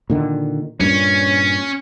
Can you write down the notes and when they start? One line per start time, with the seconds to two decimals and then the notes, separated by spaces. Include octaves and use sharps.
0.10 A#2 D3 D#3
0.80 G2 A#2 C#4